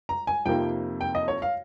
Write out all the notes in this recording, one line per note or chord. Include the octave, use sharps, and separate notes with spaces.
A#5
G#5
F2 C3 F3 A#3 D#4 G5
G5
D#5
C#5
F5